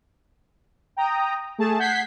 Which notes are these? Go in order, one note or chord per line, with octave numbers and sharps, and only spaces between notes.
G5 A#5 D#6
A3 G#4 A5
F#5 G6 G#6 B6 C7